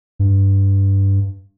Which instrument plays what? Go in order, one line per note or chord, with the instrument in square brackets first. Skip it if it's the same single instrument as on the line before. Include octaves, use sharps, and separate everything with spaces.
[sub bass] G2